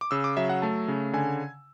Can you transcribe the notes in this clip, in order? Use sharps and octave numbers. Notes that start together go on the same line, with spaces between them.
D6
C#3 E6
D6
F#3 E5
F#5
A3 A5
C#3
D3 G#5